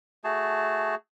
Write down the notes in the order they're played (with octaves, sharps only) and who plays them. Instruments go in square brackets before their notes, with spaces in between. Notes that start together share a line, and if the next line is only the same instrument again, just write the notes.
[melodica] A3 F#4 G#4 A5